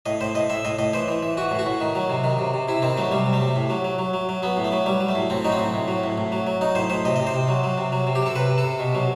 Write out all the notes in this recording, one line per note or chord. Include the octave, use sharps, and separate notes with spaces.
A2 D#5
A2 C5
A2 D#5
A2 E5
A2 D#5
A2 D#5
E3 C5
E3
E3
E3 F#4
A2
F#4
A2
D#3
F#3
C3
D#3
C3
C3
C3 E4
D#3 C4
F#3 A3
C3 G3
C3
A3
C3
A2
F#3
F#3
F#3
F#3
F#3
F#3 B3
A2
A3
F#3
F#3 G3
F#3
A3
A2
A2 C4
F#3 D#4
C4
A2
A2
F#3
A2
A2
F#3
F#3
F#3 D#4
A2 C5
A2 C5
C3 D#5
C3 D#5
C5
C3
F#3
F#3
C3
F#3
C3
G4
C3 A4
C3 B4
C3
A4
C3
B2
F#3